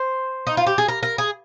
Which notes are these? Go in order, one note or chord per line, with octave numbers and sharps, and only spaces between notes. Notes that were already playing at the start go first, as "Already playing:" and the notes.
Already playing: C5
D#4
F4
G4
G#4
A#4
A#4
G#4